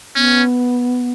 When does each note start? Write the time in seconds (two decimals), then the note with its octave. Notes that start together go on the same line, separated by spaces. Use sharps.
0.16 B3 C#4